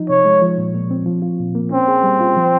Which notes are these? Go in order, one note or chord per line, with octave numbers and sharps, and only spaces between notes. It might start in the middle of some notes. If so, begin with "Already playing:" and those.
Already playing: F3 D#4
C3 C#5
G#3
F3
A#2
A#2
C4
F3
F4
A#2
A#3
C4 C#4
G#4
G3
F4
F3